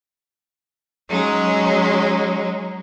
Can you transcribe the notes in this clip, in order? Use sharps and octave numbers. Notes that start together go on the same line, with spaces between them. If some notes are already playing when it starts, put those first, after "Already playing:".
F#3 G#3 C#4 D#4